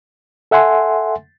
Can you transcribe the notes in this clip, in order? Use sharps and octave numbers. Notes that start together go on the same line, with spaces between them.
A4 E5 F#5 G#5 C6